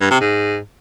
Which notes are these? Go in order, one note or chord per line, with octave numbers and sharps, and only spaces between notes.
G2
C3
G#2